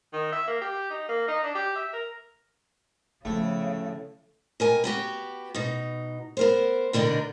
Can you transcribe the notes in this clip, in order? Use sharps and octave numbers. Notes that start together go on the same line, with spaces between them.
D#3
E5
A#3
G4
D#4
A#3
D#4
D4
G4
E5
A#4
A2 C#3 F3 A3 B3
B2 A#4 G#5
B3 F#4 G4
B2 D#4
B3 A#4 C5
B2 D3 D4 D#4 A#4